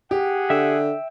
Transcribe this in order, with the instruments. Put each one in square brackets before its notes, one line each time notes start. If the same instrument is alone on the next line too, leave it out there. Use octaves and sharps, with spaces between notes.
[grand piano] G4 [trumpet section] G#4 F#5
[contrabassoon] D3 [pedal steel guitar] E5 G5 E6